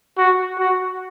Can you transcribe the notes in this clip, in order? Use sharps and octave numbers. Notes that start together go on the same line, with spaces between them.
F#4
F#4